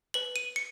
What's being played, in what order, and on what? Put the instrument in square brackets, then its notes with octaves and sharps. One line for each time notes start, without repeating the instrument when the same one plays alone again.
[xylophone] B4 F#7
D#7
C#7